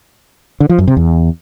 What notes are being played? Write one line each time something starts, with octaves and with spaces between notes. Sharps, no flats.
D3
F3
F#2
C3
E2